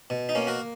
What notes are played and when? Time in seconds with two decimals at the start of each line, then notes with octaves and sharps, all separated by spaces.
0.10 B2
0.29 D#4
0.35 A#3 C#4
0.47 F#4 A#4